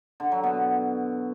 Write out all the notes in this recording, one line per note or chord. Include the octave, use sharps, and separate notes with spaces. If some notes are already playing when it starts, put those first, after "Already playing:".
D3
F#3
B2